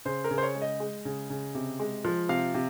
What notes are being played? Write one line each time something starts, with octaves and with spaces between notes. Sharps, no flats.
C#3 C5
A#4
C#3
C5
C#5
G#3
D#5
G#3
C#3
C#3
C3
G#3
F3
C3 F5
C3